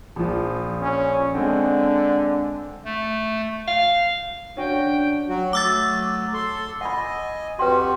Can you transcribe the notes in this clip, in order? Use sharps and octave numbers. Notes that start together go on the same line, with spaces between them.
A#1 F3
C#4
D3 G#3 C4
A3
F5
D3 C#4 D4 F#4 G5
F#3 F#4
F#3 A3 D6 E6 A6
A4 C6
D#5 F#5 G#5 B5
F2 F#4 G4 B4 G5 C6